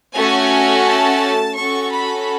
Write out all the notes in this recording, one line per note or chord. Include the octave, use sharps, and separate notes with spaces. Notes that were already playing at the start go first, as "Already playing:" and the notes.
A3 C#4 F#4 A4 G#5
A5
C#4 F#4 A4 C#6
B5